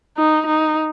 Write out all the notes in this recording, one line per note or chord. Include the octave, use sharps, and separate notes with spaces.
D#4
D#4